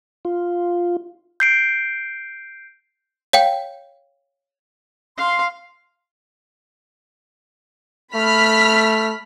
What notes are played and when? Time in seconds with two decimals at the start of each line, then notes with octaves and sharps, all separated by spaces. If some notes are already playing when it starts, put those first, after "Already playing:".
0.25 F4
1.40 G6 C7 D7
3.33 C#5 F5 G5
5.17 F5 C6
8.15 A3 B5 F6 B6